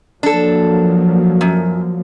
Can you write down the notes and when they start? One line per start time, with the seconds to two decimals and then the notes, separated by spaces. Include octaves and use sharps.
0.23 F3 F#3 A#3 D4 A4
1.41 F#2